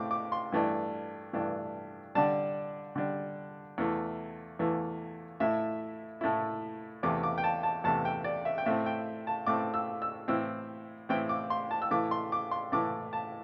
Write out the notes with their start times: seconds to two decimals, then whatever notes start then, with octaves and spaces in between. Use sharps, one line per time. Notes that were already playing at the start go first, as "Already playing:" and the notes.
Already playing: A2 A3 C4 D6
0.11 D6
0.32 C6
0.52 G2 E3 A3 D4
1.33 G2 E3 A3 D4
2.15 D3 G3 D4 A5
2.96 D3 G3 D4
3.78 E2 E3 A3
4.59 E2 E3 A3
5.40 A2 A3 E4 E5
6.21 A2 A3 E4
7.03 E2 C3 A3 D6
7.23 D6
7.38 G5
7.44 A5
7.63 A5
7.84 E2 C3 A3 A5
8.05 G5
8.24 D5
8.45 E5
8.58 G5
8.66 A2 A3 C4 E5
8.86 G5
9.27 A5
9.46 A2 A3 C4 D6
9.74 E6
10.02 E6
10.28 A2 E3 C4 E4 E6
11.09 A2 E3 C4 E4 G5
11.29 D6
11.50 C6
11.71 A5
11.82 E6
11.91 A2 E3 A3 D6
12.11 C6
12.32 D6
12.51 C6
12.72 A2 E3 A3 D6
13.13 A5